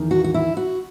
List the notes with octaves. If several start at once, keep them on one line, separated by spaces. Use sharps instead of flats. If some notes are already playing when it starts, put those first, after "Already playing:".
Already playing: E2 D#3
F#4
F#4
E4
F#4